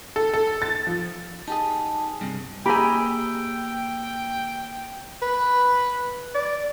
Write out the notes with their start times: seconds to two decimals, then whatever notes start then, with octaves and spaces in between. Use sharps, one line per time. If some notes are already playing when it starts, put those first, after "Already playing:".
0.16 A4
0.34 A4
0.62 A6
0.87 F3
1.48 D#4 G4 G#4 A5
2.21 G2 C3
2.66 A#3 G4 G#4 G5 G#5 A#5 B5 E6
5.22 B4
6.35 D5